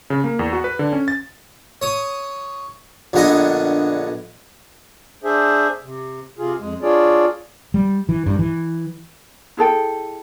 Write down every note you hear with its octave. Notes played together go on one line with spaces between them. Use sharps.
C#3
A#3
E2
F#4
B4
D3
C#4
A6
C#5 D#6
A#1 D3 B3 D#5 G#5
D4 G#4 C5 E5
C3
C3 F4 G#4
F2 G#3
D4 F4 G#4 C#5 D5
G3
E3
G2
E3
E4 G#4 A4 G5